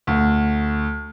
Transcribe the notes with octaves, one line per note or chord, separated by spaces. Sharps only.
D2